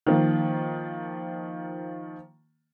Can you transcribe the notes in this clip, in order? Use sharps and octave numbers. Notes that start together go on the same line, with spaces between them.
D#3 F3 A#3